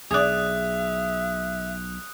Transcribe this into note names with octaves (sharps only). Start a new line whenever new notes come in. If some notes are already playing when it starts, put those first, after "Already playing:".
B1 G#4 D5 E5 D#6 F#6